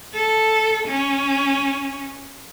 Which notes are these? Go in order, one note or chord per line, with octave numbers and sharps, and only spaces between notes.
A4
C#4